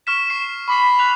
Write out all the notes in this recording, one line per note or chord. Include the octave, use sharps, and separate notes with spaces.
C#6 F6 B6 E7
C#6 C7
B5 C#6 D6 C7
F#6 F7